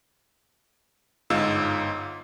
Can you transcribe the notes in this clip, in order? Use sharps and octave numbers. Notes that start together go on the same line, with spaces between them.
G1 G#2 D#4 F4 E6